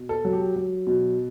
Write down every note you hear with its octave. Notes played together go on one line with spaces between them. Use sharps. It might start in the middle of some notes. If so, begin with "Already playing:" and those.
Already playing: B2
A4
F#3
G4
F#3
B2